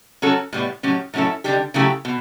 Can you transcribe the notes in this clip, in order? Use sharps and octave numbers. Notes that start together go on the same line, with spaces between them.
F#3 C#4 F#4 A4
A2 G3 B3
A2 F#3 C#4 G4
A2 F#3 C#4 E4 A4
D3 G3 D4 G4
C#3 F#3 A3 E4 G4
B2